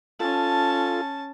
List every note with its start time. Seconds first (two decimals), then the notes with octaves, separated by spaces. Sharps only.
0.20 C#4 F4 A4 A5